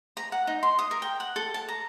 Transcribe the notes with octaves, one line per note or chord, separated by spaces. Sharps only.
A#5
F#5
D#4
C6
D#6
A#4
G5
F#5
A4
A5
A#5